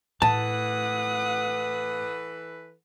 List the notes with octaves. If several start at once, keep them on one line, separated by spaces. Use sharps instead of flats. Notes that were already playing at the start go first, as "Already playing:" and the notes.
A2 E3 A4 B4 F#5 A5 D#6